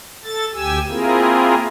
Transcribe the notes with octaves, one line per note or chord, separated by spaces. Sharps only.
A4 A6
D2 G4 G#5 E6
A#3 C4 E4 F4 G#4 A#4